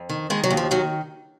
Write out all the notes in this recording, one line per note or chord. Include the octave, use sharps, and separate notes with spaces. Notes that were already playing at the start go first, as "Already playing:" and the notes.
Already playing: F2
D#3
D#3 G#3
F#3
D#2
F3
D#3 F#3